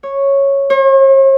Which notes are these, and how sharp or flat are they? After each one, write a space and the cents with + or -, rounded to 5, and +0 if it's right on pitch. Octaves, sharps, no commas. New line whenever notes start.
C#5 -5
C#5 -45